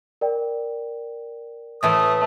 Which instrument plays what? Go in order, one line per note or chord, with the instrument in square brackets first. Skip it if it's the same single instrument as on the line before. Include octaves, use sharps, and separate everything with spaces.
[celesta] A#4 D5 G5
[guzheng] A2 E3 C6 [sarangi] A3 [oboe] D#6